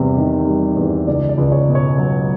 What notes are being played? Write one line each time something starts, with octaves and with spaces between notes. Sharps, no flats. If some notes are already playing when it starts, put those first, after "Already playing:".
Already playing: E2 C3 G3
D#3
G3
E2
C#2 D5
D5
C#2
C#5
B2
C#5
F#3